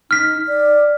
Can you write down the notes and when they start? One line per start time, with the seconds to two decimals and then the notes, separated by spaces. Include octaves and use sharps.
0.11 D#4 F6 B6
0.48 D5